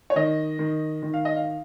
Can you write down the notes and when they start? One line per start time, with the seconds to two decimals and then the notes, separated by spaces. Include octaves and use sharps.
0.10 C#5
0.16 D#3 D#5
0.59 D#3
1.03 D#3
1.14 F5
1.25 D#5
1.36 F5